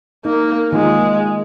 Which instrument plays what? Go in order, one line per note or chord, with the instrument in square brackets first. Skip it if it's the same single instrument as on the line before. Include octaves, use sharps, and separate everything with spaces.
[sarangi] A#3 [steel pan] D#4
[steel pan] D#3 A#3 F4 [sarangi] G#3